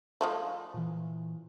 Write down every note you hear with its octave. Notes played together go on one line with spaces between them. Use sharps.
F3 G#3 A3
A#2 E3